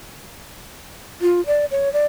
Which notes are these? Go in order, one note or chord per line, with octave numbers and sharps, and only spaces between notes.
F4
D5
C#5
D5